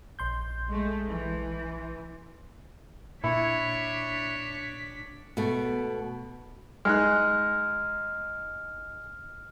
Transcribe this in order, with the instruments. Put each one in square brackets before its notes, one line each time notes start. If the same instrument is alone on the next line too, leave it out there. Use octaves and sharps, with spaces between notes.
[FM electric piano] A#1 C6 G6
[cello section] G#3 A3
E3
[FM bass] A#2 [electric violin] D4 B6 [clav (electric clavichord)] E4 [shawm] C#5
[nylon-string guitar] B2 A3
[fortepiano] G#3 D#4 F#6 [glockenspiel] F6